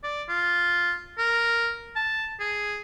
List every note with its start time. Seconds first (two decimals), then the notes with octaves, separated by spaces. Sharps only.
0.04 D5
0.29 F4
1.18 A#4
1.96 A5
2.40 G#4